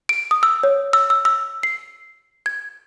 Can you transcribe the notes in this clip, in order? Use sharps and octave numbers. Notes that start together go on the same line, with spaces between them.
D7
D#6
E6
C#5
E6
E6
E6
C7
G#6